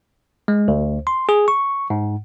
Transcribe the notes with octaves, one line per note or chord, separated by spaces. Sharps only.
G#3
D2
C6
G#4
C#6
G#2